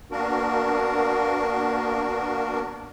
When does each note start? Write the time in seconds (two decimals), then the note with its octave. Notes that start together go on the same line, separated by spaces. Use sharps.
0.11 A#3 B3 D4 F#4 A#4